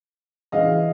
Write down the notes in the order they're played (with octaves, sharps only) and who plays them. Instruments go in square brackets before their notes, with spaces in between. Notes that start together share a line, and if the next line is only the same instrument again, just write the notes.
[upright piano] C#3 E3 G#3 D#5 F5